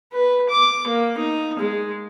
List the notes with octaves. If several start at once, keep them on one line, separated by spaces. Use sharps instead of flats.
B4
D6
A#3
D#4
G#3